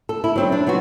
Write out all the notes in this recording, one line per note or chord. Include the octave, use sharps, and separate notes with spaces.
A4
E4
F#3 C4 D4
D4
F#3 B3 C4 F#4